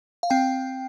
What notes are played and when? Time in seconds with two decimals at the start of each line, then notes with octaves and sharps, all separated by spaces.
0.23 F5
0.30 C4 G5